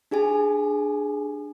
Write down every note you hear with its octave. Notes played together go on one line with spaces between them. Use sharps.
D4 G4 G#4 G#5